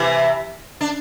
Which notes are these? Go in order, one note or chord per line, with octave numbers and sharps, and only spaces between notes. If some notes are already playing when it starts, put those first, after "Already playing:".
Already playing: C3 E3
D4